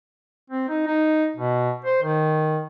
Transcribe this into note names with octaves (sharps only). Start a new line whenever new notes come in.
C4
D#4
D#4
B2
C5
D#3